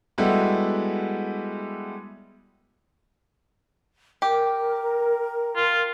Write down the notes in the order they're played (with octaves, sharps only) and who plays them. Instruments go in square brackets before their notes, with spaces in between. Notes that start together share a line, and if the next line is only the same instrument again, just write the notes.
[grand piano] G3 G#3 B3 E4 F#4 A4
[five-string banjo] G4 [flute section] A#4
[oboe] F4